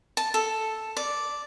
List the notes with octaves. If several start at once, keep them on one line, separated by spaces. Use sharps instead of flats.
A5
A4
D5